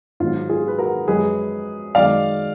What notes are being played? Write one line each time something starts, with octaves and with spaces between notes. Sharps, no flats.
G#2 D#3 F#3 F4
F4 G#4
B4
F#4 A#4
F#2 F3 G#3 G#4 B4
F#2 D#3 G#3 D5 F5